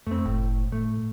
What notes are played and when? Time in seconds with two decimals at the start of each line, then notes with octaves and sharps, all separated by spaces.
0.07 F2 A3 C4
0.25 F#1 A2
0.72 A2 A3